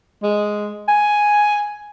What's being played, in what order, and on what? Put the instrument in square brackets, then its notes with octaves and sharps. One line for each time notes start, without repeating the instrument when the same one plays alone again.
[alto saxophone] G#3
G#5